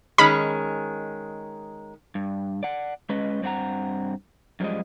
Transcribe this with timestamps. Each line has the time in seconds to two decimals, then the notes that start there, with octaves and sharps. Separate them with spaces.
0.18 D#3 G#3 C#4 B5
2.15 G2
2.63 D5 F#5
3.09 G#3 C#4 B4 D#5
3.42 G2 C4 D4 F#5 A#5
4.60 F#2 F3 G3 G#3 D#5